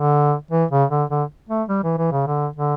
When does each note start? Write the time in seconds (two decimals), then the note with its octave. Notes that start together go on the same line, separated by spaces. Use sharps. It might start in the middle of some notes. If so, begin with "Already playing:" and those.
Already playing: D3
0.51 E3
0.71 C#3
0.91 D3
1.10 D3
1.49 A3
1.69 G3
1.84 E3
1.98 E3
2.12 C#3
2.27 D3
2.56 D3